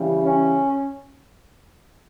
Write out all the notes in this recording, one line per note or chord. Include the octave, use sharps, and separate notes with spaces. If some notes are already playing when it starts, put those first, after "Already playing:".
Already playing: C#3 E3 G3
C#4